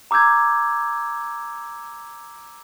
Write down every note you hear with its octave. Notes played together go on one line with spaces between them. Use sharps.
A#5 D6 E6 G6 G#6